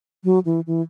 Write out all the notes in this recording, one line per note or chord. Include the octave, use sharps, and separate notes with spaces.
F#3
E3
E3